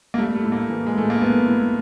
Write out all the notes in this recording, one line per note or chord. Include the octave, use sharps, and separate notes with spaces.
A#3
G3 A3
A3
A2
A#3
E3
G#3
A2 A3
A#3
A2 B3
A2